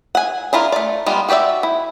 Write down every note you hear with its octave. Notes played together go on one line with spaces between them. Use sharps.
F#5 G#5
D4 E4 F4 A#4
A3 D5
G3 G#3 B3 D#4 F4
F#4 G4 C5 D5 E5
E4